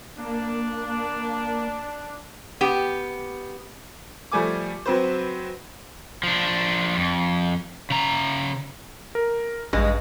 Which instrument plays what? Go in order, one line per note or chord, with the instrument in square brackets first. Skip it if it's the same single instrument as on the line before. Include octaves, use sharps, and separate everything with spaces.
[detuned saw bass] A#3 [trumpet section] D4
[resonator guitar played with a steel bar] B3 G4
[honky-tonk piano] F3 G3 A3 G#5 D6
F#3 C4 B4 C5
[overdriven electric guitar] F3 D4
F2
C#3 A#5
[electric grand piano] A#4
[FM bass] A1 [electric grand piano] G2 [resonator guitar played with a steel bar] G#3